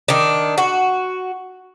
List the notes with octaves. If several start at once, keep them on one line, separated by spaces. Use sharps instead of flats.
D#3 D4
F#4